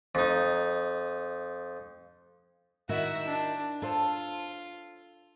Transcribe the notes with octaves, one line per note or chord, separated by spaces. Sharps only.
F2 D#4
D#3 E4 F#4 E5
D4
F4 A4 C5